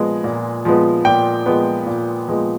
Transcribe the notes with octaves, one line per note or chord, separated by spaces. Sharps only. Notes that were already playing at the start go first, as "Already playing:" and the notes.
Already playing: A#2 F3 G#3 B3 G#5
A#2
F3 G#3 B3
A#2 G5
F3 G#3 B3
A#2
F3 G#3 B3